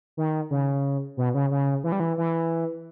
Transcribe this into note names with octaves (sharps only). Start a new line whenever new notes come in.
D#3
C#3
B2
C#3
C#3
E3
G3
E3
E3